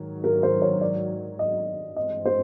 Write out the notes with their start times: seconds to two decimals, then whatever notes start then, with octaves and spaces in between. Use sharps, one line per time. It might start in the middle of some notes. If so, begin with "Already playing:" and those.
Already playing: G#2 D#3 F#3
0.24 A#4
0.43 C5
0.62 C#5
0.81 D5
1.39 D#5
1.96 G2 E3 G#3 C4 D#5
2.26 C5